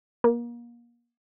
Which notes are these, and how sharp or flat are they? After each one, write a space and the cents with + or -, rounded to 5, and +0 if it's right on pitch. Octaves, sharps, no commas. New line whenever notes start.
A#3 +30